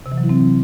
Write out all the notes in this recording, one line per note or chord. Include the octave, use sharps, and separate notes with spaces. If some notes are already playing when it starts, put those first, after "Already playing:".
C3
E3
F#3
E4
C4